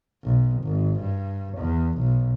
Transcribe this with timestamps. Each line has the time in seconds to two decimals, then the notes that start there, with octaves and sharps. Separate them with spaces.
0.24 B1
0.63 G#1
1.01 G2
1.58 E2
1.99 B1